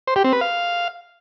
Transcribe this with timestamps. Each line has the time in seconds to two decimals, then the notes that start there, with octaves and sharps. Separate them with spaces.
0.07 C5
0.16 G4
0.24 C4
0.33 B4
0.41 F5